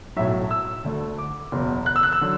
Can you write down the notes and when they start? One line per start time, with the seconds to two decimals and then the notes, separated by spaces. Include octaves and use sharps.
0.16 B1 A2 F#3 E5
0.51 E6
0.84 D2 D3 A3
1.18 D6
1.52 F#1 E2 B2
1.86 F#6
1.96 E6
2.03 F#6
2.12 E6
2.21 D3 F#3